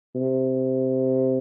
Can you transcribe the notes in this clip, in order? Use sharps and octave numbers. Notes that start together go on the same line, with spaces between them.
C3